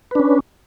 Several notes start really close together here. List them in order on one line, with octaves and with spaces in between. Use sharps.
B4 D4 C#4